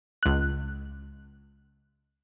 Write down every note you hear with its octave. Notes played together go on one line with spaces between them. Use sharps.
C#2 F#6